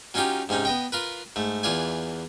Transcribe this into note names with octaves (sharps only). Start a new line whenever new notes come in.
F#3 C#4 D#4 F4 G4
G#2 C3 C#4 D#4
B3 D#5 G5
F4 A#4 B4
G#2 A3
E2 E3 F4 D5 G#5